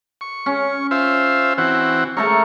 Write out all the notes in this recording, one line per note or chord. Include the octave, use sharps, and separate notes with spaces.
C#6
C#4
F4 C5 E5
E3 C4 F#4
A3 A4 A#4 C#5